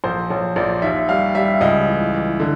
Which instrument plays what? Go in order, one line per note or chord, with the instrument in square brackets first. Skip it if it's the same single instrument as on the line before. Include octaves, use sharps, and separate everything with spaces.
[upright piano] A#1 C5
A#1 C#5
A#1 D5
D#2 E5
G3 F5
G3 E5
C#2 D#5
E3
E3
D3